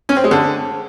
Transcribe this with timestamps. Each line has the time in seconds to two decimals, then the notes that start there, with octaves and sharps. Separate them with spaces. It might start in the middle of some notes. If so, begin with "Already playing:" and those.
0.09 C#4
0.16 C4
0.24 G#3
0.31 D3